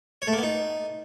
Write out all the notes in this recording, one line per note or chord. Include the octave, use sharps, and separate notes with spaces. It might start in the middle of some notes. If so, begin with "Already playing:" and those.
C#5
A3
A#3
B3
D#4